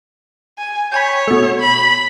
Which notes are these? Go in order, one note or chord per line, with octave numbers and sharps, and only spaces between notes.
G#5
C#5 G5 G#5 B5
B2 A3
B5